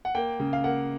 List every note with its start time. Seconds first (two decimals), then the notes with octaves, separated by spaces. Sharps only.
0.05 F#5
0.15 A#3 G5
0.40 C#3
0.53 F5
0.64 A#3 F#5